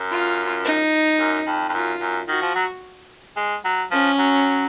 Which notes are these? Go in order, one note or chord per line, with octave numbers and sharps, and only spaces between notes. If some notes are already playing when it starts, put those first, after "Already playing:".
Already playing: F#2
F4
D#4
F#2
F2
F2
F#2 F4
F#2
D#3 F#4
F3
F#3
G#3
F#3
F3 C#4
F#3